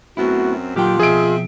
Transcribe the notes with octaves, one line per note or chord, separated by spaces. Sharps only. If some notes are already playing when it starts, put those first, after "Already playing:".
F#2 A3 B3 C4 E4 F#4
A#2 D3 D#3 F#3 F4 G4 G5
B2 F3 C4 G#4 D#5 E5 D7